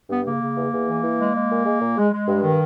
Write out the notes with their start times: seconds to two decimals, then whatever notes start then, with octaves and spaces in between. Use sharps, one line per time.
0.09 G2 B3
0.24 C#3 A#3
0.40 C#3
0.56 E2
0.71 E2
0.87 E3
1.03 E3
1.18 G#3
1.34 G#3
1.49 A#2
1.65 G#3
1.81 A#2
1.97 G#3
2.12 G#3
2.28 G2
2.43 D#3